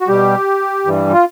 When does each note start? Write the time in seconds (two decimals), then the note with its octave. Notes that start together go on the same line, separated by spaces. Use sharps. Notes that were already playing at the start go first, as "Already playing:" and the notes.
0.01 F#4
0.08 B2 G3 G4
0.85 G2 E3 G3
1.13 F4